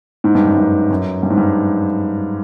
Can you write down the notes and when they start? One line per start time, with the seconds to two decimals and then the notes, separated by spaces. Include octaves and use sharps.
0.24 G#2
0.35 G2
0.46 F#2
0.57 G2
0.90 F#2
1.23 G2
1.30 G#2
1.37 G2